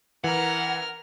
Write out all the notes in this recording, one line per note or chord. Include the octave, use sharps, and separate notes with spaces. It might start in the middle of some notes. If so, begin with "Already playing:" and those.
E3 A#4 F#5 F6